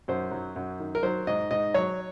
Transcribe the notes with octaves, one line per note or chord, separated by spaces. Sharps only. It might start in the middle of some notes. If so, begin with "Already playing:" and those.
F#2 C5
F#3
F#2
D#3
A#4
F#3 C5
G#2 D#5
G#2 D#5
F#3 C#5